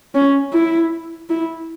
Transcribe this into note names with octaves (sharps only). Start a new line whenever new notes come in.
C#4
E4
E4